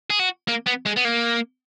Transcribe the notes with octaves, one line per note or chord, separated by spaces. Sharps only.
G#4
F#4
A#3
B3
G#3
B3
A#3